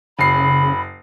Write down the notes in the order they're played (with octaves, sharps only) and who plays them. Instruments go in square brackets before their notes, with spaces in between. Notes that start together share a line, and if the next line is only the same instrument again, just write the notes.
[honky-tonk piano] F#1 C7 [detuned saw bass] C#3 [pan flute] B5